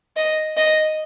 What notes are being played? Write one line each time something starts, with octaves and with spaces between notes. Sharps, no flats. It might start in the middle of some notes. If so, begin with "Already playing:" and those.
D#5
D#5